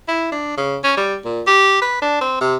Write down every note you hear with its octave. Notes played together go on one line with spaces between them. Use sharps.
E4
D4
C#3
C#4
G3
A#2
G4
B4
D4
C4
C3